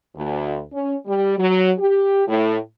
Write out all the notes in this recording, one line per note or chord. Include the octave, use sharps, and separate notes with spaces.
D2
C#4
G3
F#3
G4
A2